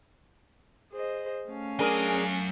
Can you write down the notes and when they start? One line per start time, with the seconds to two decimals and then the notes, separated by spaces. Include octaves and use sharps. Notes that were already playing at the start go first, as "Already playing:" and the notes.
0.91 G#4 C5 D#5
1.48 A3 C#4 F5
1.79 F#3 D4 G#4 A#4 G#5